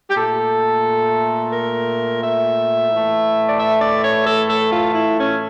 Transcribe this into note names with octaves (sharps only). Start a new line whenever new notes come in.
G4
A#2 A3 A4
A#4
E5
A2 E3 A3
D5
E5
D5
C#5
A4
A4
F4
E4
C#4